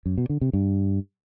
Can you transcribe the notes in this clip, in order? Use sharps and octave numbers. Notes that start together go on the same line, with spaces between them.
F#2
B2
D3
C3
G2